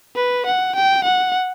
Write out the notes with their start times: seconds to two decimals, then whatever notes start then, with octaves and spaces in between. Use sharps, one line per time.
0.16 B4
0.46 F#5
0.75 G5
1.04 F#5